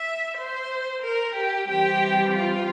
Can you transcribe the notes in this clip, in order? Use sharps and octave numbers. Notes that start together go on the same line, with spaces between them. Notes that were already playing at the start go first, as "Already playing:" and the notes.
Already playing: E5
C5
A#4
G4
E3 G3 C4 G4
F4